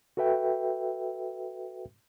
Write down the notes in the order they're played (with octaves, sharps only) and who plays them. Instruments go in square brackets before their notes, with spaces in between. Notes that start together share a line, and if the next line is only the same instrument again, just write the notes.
[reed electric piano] F#4 A4 B4 E5 G5